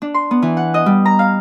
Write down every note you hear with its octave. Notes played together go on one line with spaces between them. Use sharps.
D4
C6
B3
E3
F#5
D#5
G3
A#5
F5